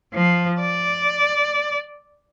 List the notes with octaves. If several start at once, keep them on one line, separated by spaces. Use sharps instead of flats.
F3
D5